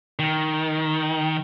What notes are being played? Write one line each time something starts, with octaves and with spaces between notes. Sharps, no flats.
D#3